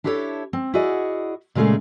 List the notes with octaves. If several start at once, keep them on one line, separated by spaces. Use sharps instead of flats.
D4 E4 G4 A4 B4 C#5
C4
E4 F#4 G#4 D5 D#5
A#2 C#3 G#3 A3 G#4 F5